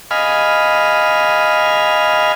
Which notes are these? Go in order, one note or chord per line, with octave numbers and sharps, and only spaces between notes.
D#5 F5 G#5 B5 F6